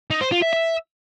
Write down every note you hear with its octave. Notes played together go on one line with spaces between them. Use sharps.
D#4
C5
F4
E5
E5